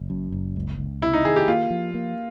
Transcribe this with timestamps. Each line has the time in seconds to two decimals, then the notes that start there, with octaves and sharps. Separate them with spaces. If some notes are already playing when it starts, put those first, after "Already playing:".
Already playing: F#1
0.10 F#2
0.32 F#1
0.56 C#2
0.79 C#2
1.02 C3 E4
1.13 D#4
1.25 D#3 G#4
1.36 G4
1.48 A#3 F4
1.70 F3
1.94 A#3